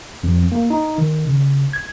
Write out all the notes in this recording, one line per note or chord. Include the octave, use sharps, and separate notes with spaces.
F2
A#3
D#4
D#3
C#3
G#6